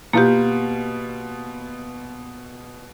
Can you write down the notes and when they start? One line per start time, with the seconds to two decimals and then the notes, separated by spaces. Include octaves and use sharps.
0.13 B2 A#3 B3 F4 G4